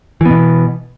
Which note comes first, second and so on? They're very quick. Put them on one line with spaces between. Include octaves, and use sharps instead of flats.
E3 B3 B2